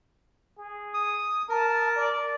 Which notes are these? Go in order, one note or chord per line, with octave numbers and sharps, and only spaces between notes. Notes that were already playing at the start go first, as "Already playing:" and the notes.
G#4
D#6
A#4 A5
D5